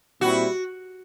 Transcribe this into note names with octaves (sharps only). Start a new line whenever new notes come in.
A#2 G3 C4 E4 F#4